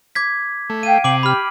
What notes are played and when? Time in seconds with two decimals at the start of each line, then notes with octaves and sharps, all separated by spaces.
0.15 D6 G#6 B6
0.70 A3
0.83 F5 G5 G#6 D#7
1.04 C3 D6 C7 F#7
1.23 G4 B5 F6